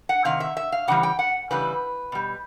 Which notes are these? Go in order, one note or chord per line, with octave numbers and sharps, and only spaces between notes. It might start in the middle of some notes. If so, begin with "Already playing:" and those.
F#5
C3 D#3 F5
E5
E5
F5
C#3 E3 G3 F#5
G5
F#5
C#3 E3 G3 B4
B2 G3